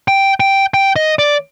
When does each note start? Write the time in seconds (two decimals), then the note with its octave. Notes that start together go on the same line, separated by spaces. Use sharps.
0.08 G5
0.40 G5
0.74 G5
0.96 D#5
1.19 D5